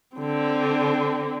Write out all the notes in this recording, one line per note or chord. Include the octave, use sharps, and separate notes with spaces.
D3 C4